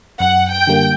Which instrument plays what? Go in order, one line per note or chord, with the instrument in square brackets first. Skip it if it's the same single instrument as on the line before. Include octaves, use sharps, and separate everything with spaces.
[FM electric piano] F#2 [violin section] F#5
[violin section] G5
[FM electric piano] D3 G3 A#3